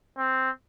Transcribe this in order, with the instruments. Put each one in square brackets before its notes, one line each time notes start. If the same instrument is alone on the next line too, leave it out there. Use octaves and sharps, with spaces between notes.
[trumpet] C4